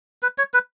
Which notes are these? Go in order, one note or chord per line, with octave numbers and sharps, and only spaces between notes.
B4
C#5
B4